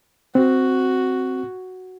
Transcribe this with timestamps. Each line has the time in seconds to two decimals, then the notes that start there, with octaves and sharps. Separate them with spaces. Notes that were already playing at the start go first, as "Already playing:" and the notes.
0.35 C4 F#4